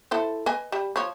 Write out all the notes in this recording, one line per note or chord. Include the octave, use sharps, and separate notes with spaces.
E4 A4 C5
B4 D#5 G#5
G3
F3 C#5